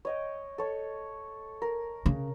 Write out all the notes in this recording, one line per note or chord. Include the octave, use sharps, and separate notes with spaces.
C#5 D#5 G5
A4 C#5
A#4
C#3